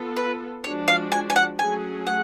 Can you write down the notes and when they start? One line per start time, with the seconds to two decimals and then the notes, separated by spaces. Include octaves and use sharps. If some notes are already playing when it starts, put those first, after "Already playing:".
Already playing: B3 F4 A4
0.16 B4
0.64 F3 G#3 D4 F#4 C#5
0.88 F5
1.12 G#5
1.30 G#5
1.36 F#5
1.59 F#3 A3 C#4 G#4 G#5
2.07 F#5